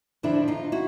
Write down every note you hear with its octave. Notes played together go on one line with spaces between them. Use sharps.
F2 D3 F3 D4 E4
D#4 F4
E4 F#4